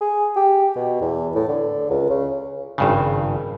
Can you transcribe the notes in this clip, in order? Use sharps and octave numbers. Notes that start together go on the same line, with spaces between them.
G#4
G4
B2
E2
A2
D3
C#2
C#3
G#1 G2 C#3